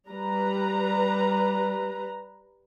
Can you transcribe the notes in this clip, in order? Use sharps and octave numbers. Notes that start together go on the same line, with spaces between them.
G3 B4 A#5